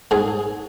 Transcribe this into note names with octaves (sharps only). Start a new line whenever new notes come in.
G#2 G#4